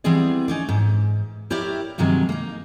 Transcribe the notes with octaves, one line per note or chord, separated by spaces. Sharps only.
E3 G3 B3 C4 G#4 D5
C#4 D#4 D5
G#2
E4 G4 A#4 C#5 D5 E5
G2 C3 D#3 F#3 G#3
A#3 D#4